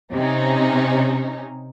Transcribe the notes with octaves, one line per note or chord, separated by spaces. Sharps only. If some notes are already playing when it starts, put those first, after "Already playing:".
C3 C#4 D#4